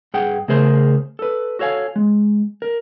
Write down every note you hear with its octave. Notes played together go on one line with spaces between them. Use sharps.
G2 G#4 F#5 G5
C#3 A3 G#4 A#4 C5 C6
A4 B4
F#4 A4 C#5 F5 G#5
G#3
A#4